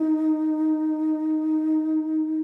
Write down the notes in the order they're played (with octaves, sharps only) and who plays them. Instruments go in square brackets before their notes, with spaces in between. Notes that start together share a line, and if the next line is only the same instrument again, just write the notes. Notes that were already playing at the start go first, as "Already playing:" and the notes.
Already playing: [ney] D#4